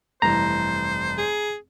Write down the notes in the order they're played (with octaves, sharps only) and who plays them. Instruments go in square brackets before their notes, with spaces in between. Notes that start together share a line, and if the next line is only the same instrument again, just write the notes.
[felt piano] F1 G2 E3 [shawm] C5 [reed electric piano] A#5
[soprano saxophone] G#4